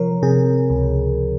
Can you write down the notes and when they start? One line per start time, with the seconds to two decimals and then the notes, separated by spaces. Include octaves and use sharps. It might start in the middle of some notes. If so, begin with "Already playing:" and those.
Already playing: C3 F3 A#4 C#5
0.23 C3 G#4
0.70 C#2